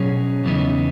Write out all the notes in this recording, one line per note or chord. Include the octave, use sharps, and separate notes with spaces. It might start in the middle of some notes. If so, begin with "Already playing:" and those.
Already playing: B2 F#3 C#4 G#4 C#5
E2 C#3 E3 B3 D#4